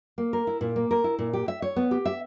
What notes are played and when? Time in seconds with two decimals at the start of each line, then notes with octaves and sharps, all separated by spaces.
0.18 A#3
0.33 A#4
0.47 E4
0.61 A#2
0.76 A#3
0.91 A#4
1.04 E4
1.19 A#2
1.33 G4
1.48 E5
1.62 C#5
1.76 B3
1.91 G4
2.05 E5